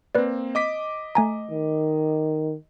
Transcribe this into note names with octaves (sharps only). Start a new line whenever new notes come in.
A#3 C4 B4 D5
D#5 D6 B6
A3 G#5 A#5
D#3